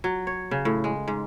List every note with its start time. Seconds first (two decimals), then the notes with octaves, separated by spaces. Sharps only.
0.04 F#3
0.27 C#5
0.51 C#3
0.65 A2
0.84 G#3
1.08 G#2